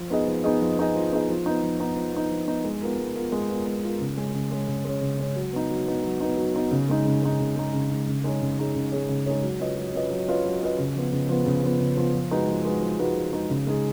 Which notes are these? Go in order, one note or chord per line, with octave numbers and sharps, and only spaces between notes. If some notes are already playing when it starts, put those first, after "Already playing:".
Already playing: F3
B3 D#4 G#4 D#5
F3
B3 D#4 G#4 D#5
F3
B3 D#4 G#4 D#5
F3
B3 D#4 G#4 D#5
F3
B3 D#4
F3
B3 D#4
F3
B3 D#4
F3
B3 D#4
G#3
B3 F4 A#4
G#3
B3 F4 A#4
G#3
B3 F4 A#4
G#3
B3 F4 A#4
C#3
G#3 C#4
C#3
G#3 C#4
C#3
G#3 C#4
C#3
G#3 C#4
F#3
B3 D#4
F#3
B3 D#4
F#3
B3 D#4
F#3
B3 D#4
C#3
G#3 D#4
C#3
G#3 D#4
C#3
G#3 D#4
C#3
G#3 D#4
C#3
G#3 D#4 G#4 C#5
C#3
G#3 D#4 G#4 C#5
C#3
G#3 D#4 G#4 C#5
C#3
G#3 D#4 G#4 C#5
F#3
C#4 F4 B4 D#5
F#3
C#4 F4 B4 D#5
F#3
C#4 F4 B4 D#5
F#3
C#4 F4 B4 D#5
C#3
F3 B3
C#3
F3 B3
C#3
F3 B3
C#3
F3 B3
F3
G#3 D#4 F#4 B4
F3
G#3 D#4 F#4 B4
F3
G#3 D#4 F#4 B4
F3
G#3 D#4 F#4 B4
C#3
G#3 D#4 G#4